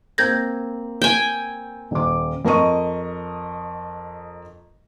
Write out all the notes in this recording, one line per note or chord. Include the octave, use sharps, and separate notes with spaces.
A#3 C4 G6 G#6 A#6
G5 G#5
D#1 D6
F2 A#4 D#5 C#6 D#7